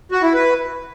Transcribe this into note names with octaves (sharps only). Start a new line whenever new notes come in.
F#4
E4
B4